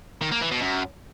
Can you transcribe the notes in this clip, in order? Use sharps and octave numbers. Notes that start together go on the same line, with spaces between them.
D#3
A#3
E3
B2
F#2